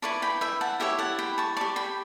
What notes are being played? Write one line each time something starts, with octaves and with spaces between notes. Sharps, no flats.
E4 B4 D5 A5 C#6
G5 B5
E5 G5
F#5 A5
E4 G4 C#5 E5 G5
F#5 A5
G5 B5
A5 C#6
G4 D5 A5 C#6
G5 B5